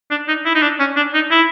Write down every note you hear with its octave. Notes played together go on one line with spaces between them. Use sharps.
D4
D#4
E4
D#4
D4
C#4
D4
D#4
E4